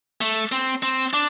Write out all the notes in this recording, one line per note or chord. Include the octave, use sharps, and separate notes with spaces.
A3
C4
C4
D4